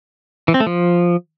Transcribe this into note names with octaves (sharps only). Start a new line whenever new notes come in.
E3
C4
A3
F3